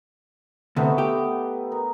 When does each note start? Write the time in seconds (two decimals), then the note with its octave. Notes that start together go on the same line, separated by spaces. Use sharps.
0.76 D2 C3 A3 B3 D#4
0.98 G4
1.72 A#4